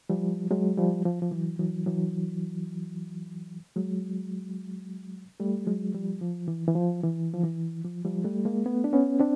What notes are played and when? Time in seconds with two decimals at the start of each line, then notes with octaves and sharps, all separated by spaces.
0.10 F3 G3
0.51 F#3 G#3
0.77 F3 G3
1.05 F3
1.22 F3
1.31 E3 F#3
1.59 E3 F#3
1.86 E3 F#3
3.76 F#3 G#3
5.40 G3 A3
5.67 F#3 G#3
5.94 F3 G3
6.21 F3
6.48 E3
6.68 E3
6.75 F3
7.03 E3
7.33 F3
7.44 E3
7.85 F3
8.05 F3 G3
8.24 G3 A3
8.45 G#3 A#3
8.66 A3 B3
8.84 D4
8.93 B3 C#4
9.20 C4 D4